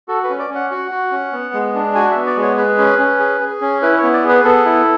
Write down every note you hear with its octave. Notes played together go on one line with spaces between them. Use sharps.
F#4 A4
B4
C#4
D5
C#4
F#5
F#4 F#5
F#4
C#4
B3
G#3
D4
F#4 G#5
B3 E5
D5
G#3
C#5
G#4 B4
C#4
C#4
G#4
G#4
C#4
E4 B4
C#5
B3
D5
G#4
B4
B3 A4
E4